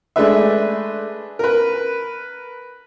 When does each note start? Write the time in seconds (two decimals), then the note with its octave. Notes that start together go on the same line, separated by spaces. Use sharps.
0.16 G#3 A3 D4 B4 E5
1.39 A#4 B4